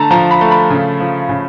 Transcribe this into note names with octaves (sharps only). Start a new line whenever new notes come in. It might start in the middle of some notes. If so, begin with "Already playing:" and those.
Already playing: D3 A3 A5 A#5
F3 A#5
B5
A3
B5
C#3
F3
C#3